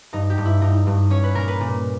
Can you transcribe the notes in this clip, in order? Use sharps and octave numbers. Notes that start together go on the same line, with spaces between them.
G2 D#4
G4
G2
E4
G2 D#4
G2
C#4 C#5
B4
A#2 A#4
B4
A#2